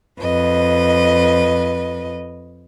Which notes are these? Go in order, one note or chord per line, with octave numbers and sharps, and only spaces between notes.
F2 B4 D#5